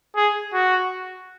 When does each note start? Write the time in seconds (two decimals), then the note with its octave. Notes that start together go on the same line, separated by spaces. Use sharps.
0.16 G#4
0.53 F#4